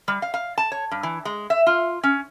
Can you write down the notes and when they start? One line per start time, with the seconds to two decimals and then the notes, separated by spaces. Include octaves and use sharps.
0.08 G3
0.22 F5
0.34 F5
0.58 A5
0.72 C#5
0.91 G2
1.03 E3
1.25 G#3
1.50 E5
1.67 F4
2.03 C#4